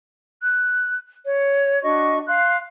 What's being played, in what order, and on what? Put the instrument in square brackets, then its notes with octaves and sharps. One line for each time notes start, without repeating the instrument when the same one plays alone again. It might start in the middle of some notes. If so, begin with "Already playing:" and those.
[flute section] F#6
C#5
D4 F#4 D#5 C#6
F5 C6 F#6